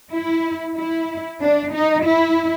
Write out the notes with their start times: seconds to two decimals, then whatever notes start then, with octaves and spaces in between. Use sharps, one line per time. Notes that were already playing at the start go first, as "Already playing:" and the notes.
0.12 E4
0.76 E4
1.42 D4
1.74 D#4
2.05 E4